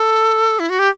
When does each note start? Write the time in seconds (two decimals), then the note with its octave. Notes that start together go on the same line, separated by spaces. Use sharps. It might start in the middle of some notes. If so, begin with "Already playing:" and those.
Already playing: A4
0.59 E4
0.69 F#4
0.79 G4